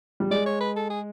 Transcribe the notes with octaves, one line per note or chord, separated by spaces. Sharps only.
G3
G#3 D5
C#5
B4
A4
G#4